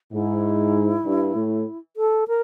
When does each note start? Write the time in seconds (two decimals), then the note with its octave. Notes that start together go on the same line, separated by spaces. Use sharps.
0.12 G#2 E4
1.05 G2
1.35 A2
1.97 A4
2.28 A#4